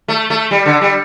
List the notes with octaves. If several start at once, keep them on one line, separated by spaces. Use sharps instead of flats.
A3
A3
G3
D3
G3